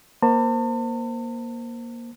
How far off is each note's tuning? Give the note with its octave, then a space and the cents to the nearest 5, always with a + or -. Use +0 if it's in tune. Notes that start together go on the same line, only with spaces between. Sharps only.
A#3 +15 C5 +0 A5 +40